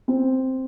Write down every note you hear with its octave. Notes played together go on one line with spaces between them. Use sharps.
C4